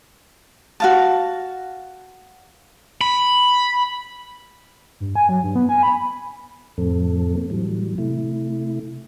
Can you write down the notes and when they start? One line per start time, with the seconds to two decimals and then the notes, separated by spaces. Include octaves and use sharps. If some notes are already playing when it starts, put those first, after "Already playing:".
0.80 F#4 F5 A5
3.01 B5
5.00 G2
5.15 G#5
5.29 F#3
5.43 G2
5.56 B3
5.69 G#5
5.83 B5
6.78 F2 A2 F3 C4 A4
7.37 A#3 C4
7.50 A2 E3 F#3 G3
7.98 C3 A3 E4